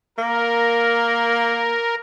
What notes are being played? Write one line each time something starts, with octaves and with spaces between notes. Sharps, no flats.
A#3 A#4